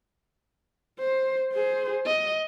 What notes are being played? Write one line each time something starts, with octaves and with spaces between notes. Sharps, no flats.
C5
G#4 C5
D#5